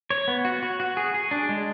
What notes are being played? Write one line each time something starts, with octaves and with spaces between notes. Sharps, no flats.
C#5
B3
F#4
F#4
F#4
G#4
G#4
D4
G#3